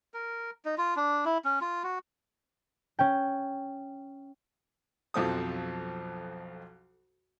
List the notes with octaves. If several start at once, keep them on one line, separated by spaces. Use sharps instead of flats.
A#4
D#4
F4
D4
E4
C#4
F4
F#4
C#4 G5
B1 F2 F3 C4 A4 D#6